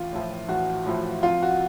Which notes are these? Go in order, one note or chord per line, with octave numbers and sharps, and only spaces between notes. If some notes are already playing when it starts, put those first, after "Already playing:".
Already playing: A1 F4
A2 F3
A1 F#4
A2 F3
F2 F4
F#4